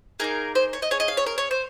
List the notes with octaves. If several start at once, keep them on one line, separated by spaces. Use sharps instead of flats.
A#3 D#4 G#4 A#4
C5
C#5
D#5
C#4 G#4 C#5
D#5
F5
C#5
A#4
C#5
C5